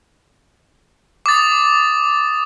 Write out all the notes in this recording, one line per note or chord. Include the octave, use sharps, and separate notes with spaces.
D6 D#6 A6